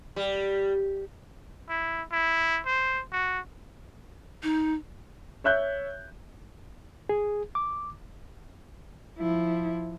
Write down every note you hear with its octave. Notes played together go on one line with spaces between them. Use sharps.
G3
E4
E4
C5
F#4
D#4
C#5 E5 F#6 G6
G#4
D6
F3 E4